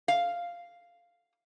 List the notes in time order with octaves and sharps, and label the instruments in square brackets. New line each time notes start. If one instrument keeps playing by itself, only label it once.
[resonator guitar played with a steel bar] F5